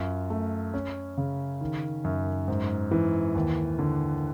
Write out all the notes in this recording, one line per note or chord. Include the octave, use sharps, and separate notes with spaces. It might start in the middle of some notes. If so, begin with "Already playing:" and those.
Already playing: F#2 F4
A3
C#4
C#3
D#3
F#2
G#2
E3
D#2
D3